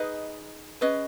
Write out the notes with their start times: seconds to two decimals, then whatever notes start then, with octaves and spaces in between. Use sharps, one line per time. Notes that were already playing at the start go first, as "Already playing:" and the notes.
Already playing: D#4 G#4 B4 D#5
0.81 C#4 G#4 B4 D#5